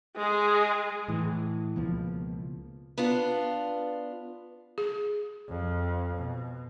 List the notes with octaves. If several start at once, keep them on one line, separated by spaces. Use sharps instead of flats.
G#3 G#4
A2 E3
C#2 B2 F3 A#3
B3 D4 F4
G#4
F2
B2